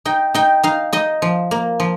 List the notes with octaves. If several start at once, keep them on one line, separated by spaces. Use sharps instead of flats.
D#4 G5
D#4 G5
D#4 F5
D#4 D#5
F3
A#3
F3